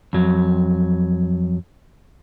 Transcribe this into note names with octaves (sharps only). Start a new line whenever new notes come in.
F2 F#3